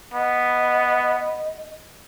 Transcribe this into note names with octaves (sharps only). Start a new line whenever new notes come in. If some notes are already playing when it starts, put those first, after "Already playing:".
B3 D#5